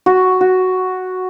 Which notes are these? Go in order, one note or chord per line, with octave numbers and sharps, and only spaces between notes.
F#4
F#4